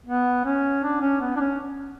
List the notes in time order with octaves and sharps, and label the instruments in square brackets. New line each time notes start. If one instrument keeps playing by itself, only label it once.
[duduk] B3
C#4
D4
C#4
B3
D4
C#4